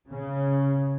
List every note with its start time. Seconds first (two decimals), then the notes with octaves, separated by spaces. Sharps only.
0.11 C#3